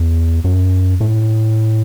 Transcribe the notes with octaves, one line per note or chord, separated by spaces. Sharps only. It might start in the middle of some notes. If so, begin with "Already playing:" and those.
Already playing: E2
F#2
A2